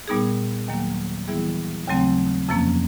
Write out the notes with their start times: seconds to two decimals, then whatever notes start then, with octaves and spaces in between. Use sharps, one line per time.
0.08 A#2 G3 B3 D#4 G#4
0.68 D#2 D#3 F#3 A#3
1.28 E3 G3 B3 E4 G#4
1.88 D#2 C#3 F#3 A3 C4
2.49 F2 C3 F3 A#3 C#4